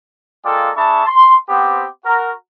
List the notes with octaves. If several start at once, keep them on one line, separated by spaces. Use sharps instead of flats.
G#3 A#3 F4 A4 D5 G5
D4 G#4 E5 A5 B5 C#6
C6
B3 C4 G4
F#4 A#4